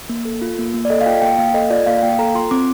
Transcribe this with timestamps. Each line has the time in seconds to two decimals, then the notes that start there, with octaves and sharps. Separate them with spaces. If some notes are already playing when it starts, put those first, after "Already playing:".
0.09 A#3
0.25 A4
0.42 F4
0.59 A#3
0.74 A#3
0.85 D5
0.90 A4 D#5
1.01 F5
1.06 F4 G5
1.22 A#3 G5
1.38 A#3 F5
1.54 A4 D#5
1.70 F4 D5
1.86 A#3 F5
1.98 F5
2.03 A#3 G5
2.19 A4 A#5
2.35 F4 C6
2.51 C4 D6